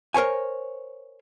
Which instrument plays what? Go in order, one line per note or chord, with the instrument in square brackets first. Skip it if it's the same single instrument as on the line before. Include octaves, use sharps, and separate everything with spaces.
[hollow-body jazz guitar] A#4 C5 C#5 G#5